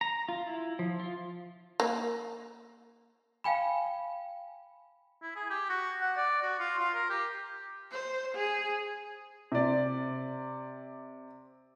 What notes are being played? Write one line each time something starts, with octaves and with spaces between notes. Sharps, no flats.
A#5
F4
E4
F3
F4
A#3
F5 G5 G#5 B5
E4
G#4
G4
F#4
F#5
D5
F#4
F4
F4
A#4
G4
C5
G#4
C3 D5